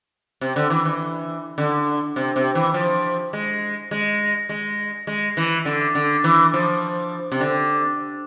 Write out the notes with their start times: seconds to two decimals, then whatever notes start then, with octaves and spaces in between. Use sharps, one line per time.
0.41 C3
0.56 D3
0.70 E3
0.85 E3
1.58 D3
2.16 C3
2.36 C3
2.55 E3
2.74 F3
3.33 G#3
3.91 G#3
4.49 G#3
5.07 G#3
5.37 E3
5.65 D3
5.95 D3
6.24 E3
6.54 F3
7.32 C3
7.40 D3